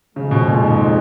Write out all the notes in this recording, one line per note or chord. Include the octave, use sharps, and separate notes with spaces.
F2 C#3 F3 G#3
B2
A#2
G#2